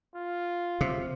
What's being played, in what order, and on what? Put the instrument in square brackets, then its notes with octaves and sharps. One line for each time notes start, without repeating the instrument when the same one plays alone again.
[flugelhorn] F4
[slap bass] C3